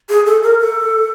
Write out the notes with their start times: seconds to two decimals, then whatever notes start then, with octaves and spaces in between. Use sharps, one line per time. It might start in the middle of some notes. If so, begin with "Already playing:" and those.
0.09 G#4
0.26 A4
0.43 A#4
0.60 A4